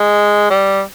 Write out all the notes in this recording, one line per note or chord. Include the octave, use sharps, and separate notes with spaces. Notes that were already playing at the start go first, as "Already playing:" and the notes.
Already playing: G#3
G3